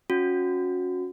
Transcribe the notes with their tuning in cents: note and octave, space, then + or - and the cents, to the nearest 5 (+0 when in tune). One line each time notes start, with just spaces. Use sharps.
C#4 +0 F#4 -25